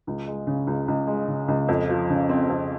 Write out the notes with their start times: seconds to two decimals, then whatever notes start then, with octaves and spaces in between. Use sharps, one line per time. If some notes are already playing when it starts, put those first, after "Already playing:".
0.07 C#2
0.28 G#3
0.47 C#3
0.67 C#2
0.88 C#2
1.07 G#3
1.28 C#3
1.48 C#2
1.68 F2
1.89 F3
2.10 C#3
2.29 C4
2.49 F2